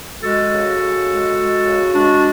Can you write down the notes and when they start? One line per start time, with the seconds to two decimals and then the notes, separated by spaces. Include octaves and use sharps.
0.23 G#3 F#4 A4
0.52 C#3
0.79 C#3
1.09 G#3
1.37 G#3
1.64 C#3
1.93 G#3 D4 F#4